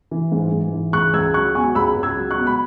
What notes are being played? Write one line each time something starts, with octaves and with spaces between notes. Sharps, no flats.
E3
G#2
G#2
E3
C#2 C#6 F#6
C#2 E6 G#6
F#3 C#6 F#6
B2 G#5 C#6
C#2 B5 E6
C#2
E6 G#6
F#3
C#6 F#6
B2
B5